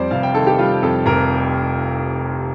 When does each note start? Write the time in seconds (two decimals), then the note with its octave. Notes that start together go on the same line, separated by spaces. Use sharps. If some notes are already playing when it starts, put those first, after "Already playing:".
Already playing: F2 G3 C5 D5
0.11 F1 F5
0.23 G5
0.34 D#3 A4
0.47 G4
0.59 G3 F4
0.82 F2 A4
1.06 F1 A#4